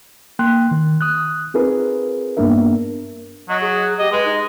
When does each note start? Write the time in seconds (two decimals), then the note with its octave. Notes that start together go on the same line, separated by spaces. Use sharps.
0.39 A#3 G5 C6 F#6
0.71 D#3
1.01 D#6 F#6
1.54 C4 D#4 F4 G#4 A#4 B4
2.37 G2 A#3 B3 D4 A#4 E5
3.49 F#3 D#5
3.61 G#4
3.99 G4 D#5
4.12 G#3 B4
4.25 D#4